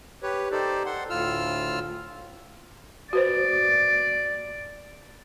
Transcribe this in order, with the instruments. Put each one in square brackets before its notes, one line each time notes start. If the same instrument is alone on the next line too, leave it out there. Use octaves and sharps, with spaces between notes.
[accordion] G4 B4 C#5
D#4 G4 A4 C5 D5
A4 F#5 C6
D2 A2 F4 E6 F6
[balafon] F#4 B4 C5 [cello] D5